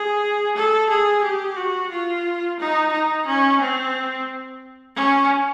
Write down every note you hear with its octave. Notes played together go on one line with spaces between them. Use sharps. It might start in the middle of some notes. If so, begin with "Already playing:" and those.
Already playing: G#4
A4
G#4
G4
F#4
F4
D#4
D#4
C#4
C4
C#4